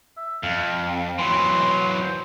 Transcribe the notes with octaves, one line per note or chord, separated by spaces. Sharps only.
E5
F2 F5
E3 F#3 C6
C5